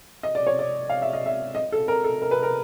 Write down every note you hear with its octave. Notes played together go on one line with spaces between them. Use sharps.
D#5
D5
C#5
D5
F5
E5
D#5
E5
D#5
A4
A#4
A4
A#4
B4
A#4